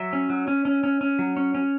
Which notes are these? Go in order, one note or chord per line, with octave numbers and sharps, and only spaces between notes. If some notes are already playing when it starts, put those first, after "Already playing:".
Already playing: F#3 E5
C#4
F#3
C#4
C#4
C#4
C#4
F#3
C#4
C#4